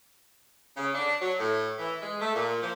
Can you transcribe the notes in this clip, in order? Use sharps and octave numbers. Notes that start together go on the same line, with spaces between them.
C#3
D4
F#3
A2
E3
G#3
A3
A#2
F3